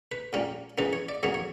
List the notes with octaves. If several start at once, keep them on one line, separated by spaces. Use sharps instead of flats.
B4
A#2 G3 A#3 C#4
C#3 E3 A#3 C#4 B4
C#5
D5
E2 C#3 F#3 A#3 C#5
C#5